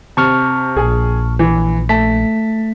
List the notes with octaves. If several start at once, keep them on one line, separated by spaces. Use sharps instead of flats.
C3 A5 C#6 F6
A#1 G#4 G#5
E3
A3 A5 B6